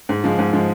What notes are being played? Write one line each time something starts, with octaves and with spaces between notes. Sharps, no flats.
G#2
F3 G#3
G#2
F3 G#3